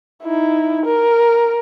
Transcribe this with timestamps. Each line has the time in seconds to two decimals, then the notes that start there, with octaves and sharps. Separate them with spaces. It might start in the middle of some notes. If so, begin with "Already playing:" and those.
0.23 D#4 E4
0.86 A#4